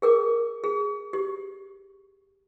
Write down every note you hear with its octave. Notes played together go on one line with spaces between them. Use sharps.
G#4 A#4 D6
G#4
G4